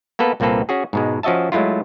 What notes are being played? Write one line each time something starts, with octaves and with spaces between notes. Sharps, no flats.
A#3 B3 A4 B4
C2 A#2 A#3 C4 A4 B4
C#4 F#4 G#4
G#2 B2 G#3
F3 C#4 F#4 D#5 E5 A5
F#3 G#3 A3 E4 F4